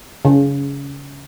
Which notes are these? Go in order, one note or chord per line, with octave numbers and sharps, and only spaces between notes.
C#3